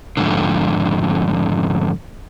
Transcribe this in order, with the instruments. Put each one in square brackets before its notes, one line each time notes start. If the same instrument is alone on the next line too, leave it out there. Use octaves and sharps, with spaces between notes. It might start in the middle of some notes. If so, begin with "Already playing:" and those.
[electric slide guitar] F2 G#2 D3